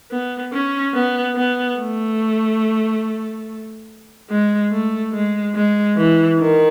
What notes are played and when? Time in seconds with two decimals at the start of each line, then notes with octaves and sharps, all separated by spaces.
0.11 B3
0.52 C#4
0.94 B3
1.36 B3
1.78 A3
4.30 G#3
4.71 A3
5.13 G#3
5.55 G#3
5.97 E3
6.39 D#3